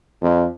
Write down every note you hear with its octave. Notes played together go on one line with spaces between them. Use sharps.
F2